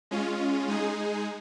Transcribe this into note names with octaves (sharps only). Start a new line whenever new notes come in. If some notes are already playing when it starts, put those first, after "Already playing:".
G#3 C#4 F4
G#3 D#4 G#4